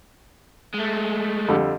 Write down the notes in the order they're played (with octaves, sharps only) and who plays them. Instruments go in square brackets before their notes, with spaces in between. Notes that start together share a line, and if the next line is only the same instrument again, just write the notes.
[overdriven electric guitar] G#3 A3
[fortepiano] F2 D3 G3